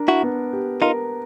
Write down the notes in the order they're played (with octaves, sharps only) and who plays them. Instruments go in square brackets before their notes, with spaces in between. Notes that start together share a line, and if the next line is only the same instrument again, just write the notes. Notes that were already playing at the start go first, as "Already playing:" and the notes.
Already playing: [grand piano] D4 A#4
[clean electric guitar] E4 F#4
[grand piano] B3
G4
[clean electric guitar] D#4 F4 [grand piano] A#4